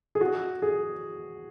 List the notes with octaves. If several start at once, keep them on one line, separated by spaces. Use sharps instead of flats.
G#4
F#4
G#4